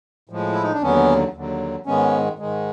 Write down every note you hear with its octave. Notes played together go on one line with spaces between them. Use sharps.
A2 F3 G#3
E4
D#4
D4
D#2 D3 F#3 B3 C#4
D#2 D3 F#3
G#2 D#3 G#3 B3 C#4
G#2 D#3 G#3